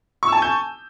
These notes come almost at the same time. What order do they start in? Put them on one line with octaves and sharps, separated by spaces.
C#6 E6 A5 G#5 G6